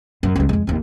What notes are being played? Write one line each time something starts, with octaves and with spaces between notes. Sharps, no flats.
F#2
C#2 G3
F2 G#3
G#1 D#2